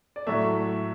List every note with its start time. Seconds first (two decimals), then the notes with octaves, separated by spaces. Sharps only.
0.16 D5
0.27 A2 F#3 A3 E5